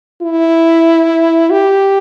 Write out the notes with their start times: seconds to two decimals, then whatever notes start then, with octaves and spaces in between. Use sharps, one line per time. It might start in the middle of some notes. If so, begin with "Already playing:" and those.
0.22 E4
1.50 G4